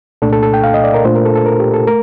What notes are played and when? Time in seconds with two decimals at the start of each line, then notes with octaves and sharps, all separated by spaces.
0.22 C2 A#2 A3 D4 A4
0.32 A4
0.43 A4
0.54 G5
0.64 F5
0.74 D#5
0.84 D5
0.94 A#4
1.04 A#2 A3 D4 F4 C5
1.15 A#4
1.25 A4
1.35 A4
1.46 A#4
1.60 G4
1.74 A4
1.88 A3 A#4